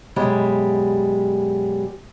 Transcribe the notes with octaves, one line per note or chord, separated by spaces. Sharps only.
F#2 B2 G3 G#3